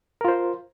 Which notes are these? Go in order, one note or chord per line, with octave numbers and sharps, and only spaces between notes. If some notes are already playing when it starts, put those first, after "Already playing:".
F4 A#4 C5